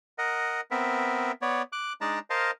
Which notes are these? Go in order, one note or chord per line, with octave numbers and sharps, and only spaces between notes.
A#4 D#5 F#5
B3 C4 A#4 E5
B3 C#5 D5
D6 F#6
G#3 D4 D#4 D5 A5 A#5
A#4 C5 D#5 F5 A5